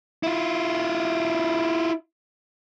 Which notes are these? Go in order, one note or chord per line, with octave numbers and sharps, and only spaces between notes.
E4 F4